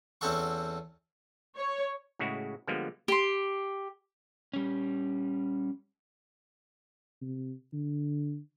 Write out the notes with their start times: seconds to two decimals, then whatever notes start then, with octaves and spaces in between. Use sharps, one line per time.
0.21 E2 C4 C#4 A4 F#5 C#6
1.56 C#5
2.19 A2 C#3 G#3 E4 F#4
2.67 D3 F3 G3 G#3 A#3 B3
3.08 G4 C6
4.53 G3 C#4
7.21 C3
7.73 D3